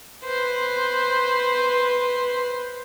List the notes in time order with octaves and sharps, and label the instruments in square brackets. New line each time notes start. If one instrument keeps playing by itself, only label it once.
[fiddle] B4 C5